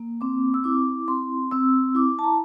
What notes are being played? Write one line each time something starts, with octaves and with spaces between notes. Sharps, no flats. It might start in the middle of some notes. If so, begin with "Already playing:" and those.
Already playing: A#3
C4 D6
E6
E4 D6
C4 C6
C4 E6
E4 D6
A5
A#5